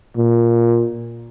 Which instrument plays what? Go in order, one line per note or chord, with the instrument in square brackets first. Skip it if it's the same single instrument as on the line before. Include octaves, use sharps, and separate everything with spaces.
[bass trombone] A#2